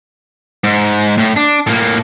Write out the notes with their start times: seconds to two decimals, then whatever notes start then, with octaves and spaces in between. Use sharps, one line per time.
0.64 G#2
1.18 A2
1.36 D4
1.67 A2 A#3